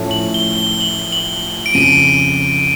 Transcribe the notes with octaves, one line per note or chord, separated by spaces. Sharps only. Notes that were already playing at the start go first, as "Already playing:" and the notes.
Already playing: A2 F3 A3 C#4
F#7
G7
G7
F#7
F#7
D7
F2 C#3 F3 D#7